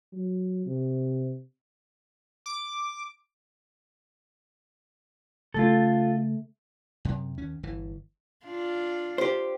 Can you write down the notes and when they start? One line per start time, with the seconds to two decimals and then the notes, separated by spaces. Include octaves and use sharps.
0.13 F#3
0.66 C3
2.46 D6
5.54 C#3 A3 F4 A4
7.05 F#2 C3
7.38 D#2 C#4
7.63 G1 E3
8.46 D4 F4
9.18 G4 C5